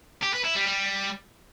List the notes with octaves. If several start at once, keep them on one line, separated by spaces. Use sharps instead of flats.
G4
B4
E4
G3
G3